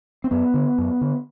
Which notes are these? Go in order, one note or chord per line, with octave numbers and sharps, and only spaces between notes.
C4
F#2 B3
D3
F#2
D3